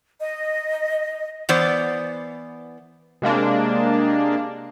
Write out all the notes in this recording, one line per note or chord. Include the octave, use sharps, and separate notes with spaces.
D#5
E3 B3 C5 D5
C3 G#3 A#3 D4